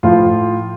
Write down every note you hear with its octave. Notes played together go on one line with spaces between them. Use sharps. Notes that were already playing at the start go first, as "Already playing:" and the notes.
A2 F3 F4